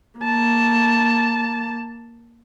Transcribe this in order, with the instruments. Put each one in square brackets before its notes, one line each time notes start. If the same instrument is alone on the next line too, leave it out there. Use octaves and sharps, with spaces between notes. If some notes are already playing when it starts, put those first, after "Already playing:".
[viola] A#3 A5